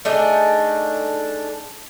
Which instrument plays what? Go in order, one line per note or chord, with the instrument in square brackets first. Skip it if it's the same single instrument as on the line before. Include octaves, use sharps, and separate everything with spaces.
[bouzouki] A3 D4 D#4 G#4